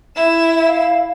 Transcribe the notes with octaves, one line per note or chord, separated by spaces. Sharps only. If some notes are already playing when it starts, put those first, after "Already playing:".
E4 E7
F5